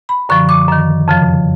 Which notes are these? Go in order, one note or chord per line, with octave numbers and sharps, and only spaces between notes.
B5
F#2 D3 F3 C#6
D6
F#2 D#3
F2 C#3 F3